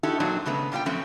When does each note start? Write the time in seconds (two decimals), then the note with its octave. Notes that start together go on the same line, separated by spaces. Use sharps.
0.03 D#4 E4 F#4 G4 A4
0.20 A#2 F#3 C4 D4 D#4 F#4
0.46 C#3 G#3 A3 B3
0.72 A#2 G3 F4 C5 G5
0.86 F3 F#3 A3 C4 C#4 F#4